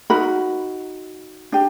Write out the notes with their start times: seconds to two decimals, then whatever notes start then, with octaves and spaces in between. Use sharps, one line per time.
0.10 D#4 F#4 A#4 B5
1.52 D4 G4